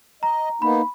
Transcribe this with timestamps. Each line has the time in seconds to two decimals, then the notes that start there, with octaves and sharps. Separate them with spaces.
0.23 D#5 A#5
0.62 A#3 B3 D#4 B5